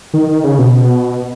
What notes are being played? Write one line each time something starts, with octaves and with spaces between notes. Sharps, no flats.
D#3
D#3
C#3
B2